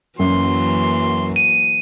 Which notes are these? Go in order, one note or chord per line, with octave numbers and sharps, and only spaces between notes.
F#2 E3 F#3 A#3 C6
D#7